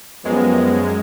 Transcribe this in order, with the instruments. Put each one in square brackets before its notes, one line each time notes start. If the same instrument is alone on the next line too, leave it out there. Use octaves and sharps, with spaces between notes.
[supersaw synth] F#2 G#3 [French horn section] F3 G3 B3